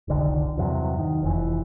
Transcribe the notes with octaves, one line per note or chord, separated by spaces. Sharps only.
F1 C2 D3 D#3
E2 G2 C3 F#3
D#3
F1 E3